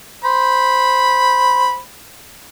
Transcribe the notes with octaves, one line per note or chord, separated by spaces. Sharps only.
C5 B5